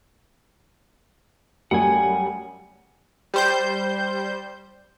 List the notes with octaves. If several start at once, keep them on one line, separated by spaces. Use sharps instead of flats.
F#2 G3 A3 F#5 G#5
G3 C5 G6